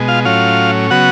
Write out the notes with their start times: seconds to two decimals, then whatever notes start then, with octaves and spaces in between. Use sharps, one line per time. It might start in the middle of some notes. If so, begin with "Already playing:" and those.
Already playing: B2 G#3
0.08 F4 F5
0.25 A2 F#3 C#4 F4 F5
0.90 C#3 F#3 B3 F#4 F#5